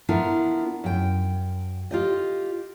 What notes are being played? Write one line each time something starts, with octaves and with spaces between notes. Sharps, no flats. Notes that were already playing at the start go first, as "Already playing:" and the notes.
B3 D4 E4 F4 A#4
F#2 G5
F4 G4 D#5